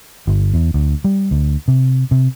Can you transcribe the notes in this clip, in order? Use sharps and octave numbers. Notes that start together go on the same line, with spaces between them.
G1
E2
D2
G3
D2
C3
C3